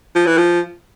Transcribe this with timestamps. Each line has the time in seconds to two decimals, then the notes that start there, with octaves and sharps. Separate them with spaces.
0.15 F3
0.26 E3
0.37 F3